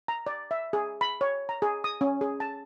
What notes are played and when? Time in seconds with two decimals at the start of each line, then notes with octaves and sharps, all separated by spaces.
0.08 A#5
0.27 D5
0.51 E5
0.73 G#4
1.01 B5
1.21 C#5
1.49 A#5
1.62 G#4
1.84 D#6
2.01 C#4
2.21 G#4
2.40 A5